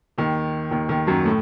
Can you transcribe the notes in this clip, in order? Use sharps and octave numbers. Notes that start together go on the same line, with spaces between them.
D#2 D#3
D#2 D#3
D#2 D#3
F#2 F#3
A2 A3